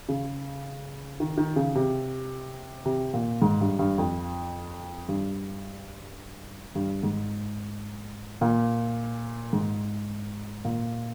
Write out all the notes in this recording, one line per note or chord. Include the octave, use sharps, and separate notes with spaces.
C#3
D#3
D#3
C#3
C3
C3
A#2
G#2
G2
G2
F2
G2
G2
G#2
A#2
G#2
A#2